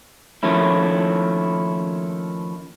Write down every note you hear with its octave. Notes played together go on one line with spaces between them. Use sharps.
D#3 F3 A3 A#3 C#4 E4